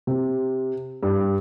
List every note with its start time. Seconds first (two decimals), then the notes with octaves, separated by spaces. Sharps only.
0.07 C3
1.03 G2